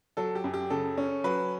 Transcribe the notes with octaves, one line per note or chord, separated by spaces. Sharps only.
F#3 A4
G4
F#2
G4
C#3 A4
C#4
F#3 B4